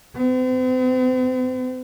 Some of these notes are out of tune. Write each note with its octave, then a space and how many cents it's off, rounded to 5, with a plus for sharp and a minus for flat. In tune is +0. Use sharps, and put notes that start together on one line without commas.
C4 -45